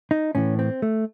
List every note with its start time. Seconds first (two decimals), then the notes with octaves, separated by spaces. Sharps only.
0.11 D#4
0.35 A2 E3 C#4
0.59 C4
0.82 A3